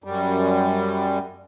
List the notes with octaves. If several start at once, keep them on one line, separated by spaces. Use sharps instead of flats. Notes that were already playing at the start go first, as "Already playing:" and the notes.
F#2 G3